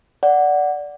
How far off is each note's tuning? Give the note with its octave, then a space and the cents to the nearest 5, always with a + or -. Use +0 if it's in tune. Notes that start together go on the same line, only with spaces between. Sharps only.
D5 -10 F#5 +0